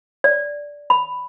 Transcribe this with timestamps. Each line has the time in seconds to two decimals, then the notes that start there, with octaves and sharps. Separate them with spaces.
0.24 D5
0.90 B5